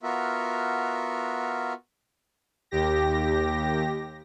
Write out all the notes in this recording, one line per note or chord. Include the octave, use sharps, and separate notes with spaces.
B3 F4 F#4 A#4 E5
D#2 G4 A#6